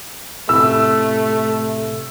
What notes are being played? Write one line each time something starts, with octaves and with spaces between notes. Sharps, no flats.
A2 C3 A3 E6